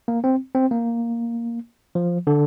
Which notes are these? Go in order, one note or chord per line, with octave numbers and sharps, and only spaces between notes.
A#3
C4
C4
A#3
F3
D3